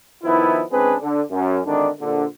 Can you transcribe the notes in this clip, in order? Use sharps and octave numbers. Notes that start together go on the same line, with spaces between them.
D#3 F3 B3 E4
C#2 C4 D4 G#4 B4
D3
F#2
G#1 D3 D#3 D4
A#1 D3